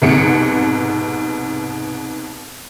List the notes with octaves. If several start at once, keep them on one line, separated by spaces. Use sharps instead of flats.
F1 C2 G#2 B2 C#7 D7